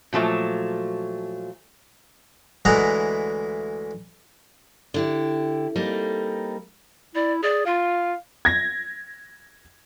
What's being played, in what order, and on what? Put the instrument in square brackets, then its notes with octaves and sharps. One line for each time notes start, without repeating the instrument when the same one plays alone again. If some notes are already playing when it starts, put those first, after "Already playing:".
[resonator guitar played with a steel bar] A#2 F3 F#3 A3
[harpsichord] D2 E3 G#3 E4 F#5 A#5
[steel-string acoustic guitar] D3 E4 G4
G3 A#3 C4 D#4 A4
[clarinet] E4 [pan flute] D5
[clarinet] G#4 [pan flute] D5
[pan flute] F4 [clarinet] F5
[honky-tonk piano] G#6 A#6